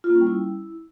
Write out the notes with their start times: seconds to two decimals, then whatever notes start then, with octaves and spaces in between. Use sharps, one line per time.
0.04 F4
0.10 A#3
0.15 C#4
0.21 G3
0.27 E4